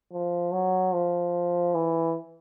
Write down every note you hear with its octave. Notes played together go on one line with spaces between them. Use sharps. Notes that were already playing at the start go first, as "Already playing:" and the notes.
F3
F#3
F3
E3